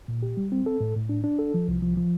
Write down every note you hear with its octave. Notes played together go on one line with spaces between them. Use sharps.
A#2
G4
G3
C4
A4
A2
A2
D4
D4
A4
F3
C2
F3
F3